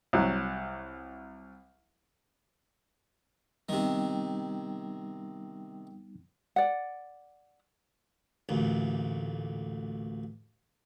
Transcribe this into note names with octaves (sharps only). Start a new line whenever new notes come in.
C2 F#3
C3 D#3 G3 B3 D#4
D5 F#5
A1 D2 A#2